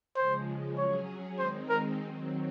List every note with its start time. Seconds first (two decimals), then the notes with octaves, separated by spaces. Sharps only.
0.17 C#3 F3 G#3 C5
0.77 F#3 C#4 G#4 C#5
1.38 D#3 G#3 C4 D#4 C5
1.69 A#4
2.00 D#3 F#3 C4